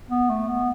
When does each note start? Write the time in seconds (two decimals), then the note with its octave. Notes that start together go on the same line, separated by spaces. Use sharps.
0.10 B3
0.30 A3
0.49 B3